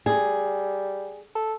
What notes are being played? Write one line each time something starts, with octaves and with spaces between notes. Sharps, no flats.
G3 G#4
A4